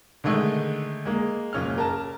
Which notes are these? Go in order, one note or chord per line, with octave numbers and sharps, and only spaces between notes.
D3 D#3 G#3 A3
G#3 A#3
F#1 C#4 F6
A#4 A5